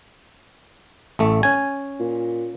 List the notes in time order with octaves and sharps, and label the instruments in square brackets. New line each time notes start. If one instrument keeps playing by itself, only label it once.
[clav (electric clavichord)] A1 A3
C#4 G#5
[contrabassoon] A#2